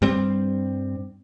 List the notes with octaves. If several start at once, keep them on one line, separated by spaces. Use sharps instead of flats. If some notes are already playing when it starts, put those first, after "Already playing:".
G2 G3 C4